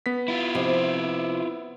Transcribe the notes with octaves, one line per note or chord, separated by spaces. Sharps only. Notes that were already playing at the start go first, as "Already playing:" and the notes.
B3 B6
E4 F4
C3 F3 D#5